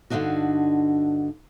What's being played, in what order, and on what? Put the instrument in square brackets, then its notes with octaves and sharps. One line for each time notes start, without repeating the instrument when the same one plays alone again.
[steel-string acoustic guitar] G2 D3 D#3 D4 D#4 F#4